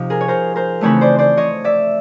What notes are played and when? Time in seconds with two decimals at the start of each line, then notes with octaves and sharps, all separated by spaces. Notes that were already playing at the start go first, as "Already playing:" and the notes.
Already playing: C3 F3 C4 D#4 D#5
0.10 G#4 A#4
0.21 C#5
0.28 A#4 C5
0.56 A#4 C5
0.81 C#3 E3 A3 C4 D#4 B4 C#5
1.01 C5 D5
1.19 C5 D5
1.37 C#5 D#5
1.64 D5 E5